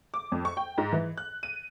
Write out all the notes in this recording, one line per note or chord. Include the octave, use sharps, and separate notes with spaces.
D6
F2
C#6
G5
G#2
E3
F#6
D#7